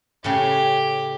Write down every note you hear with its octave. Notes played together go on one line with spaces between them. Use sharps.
A2 C#3 G4